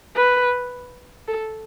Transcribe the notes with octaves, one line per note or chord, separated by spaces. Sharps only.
B4
A4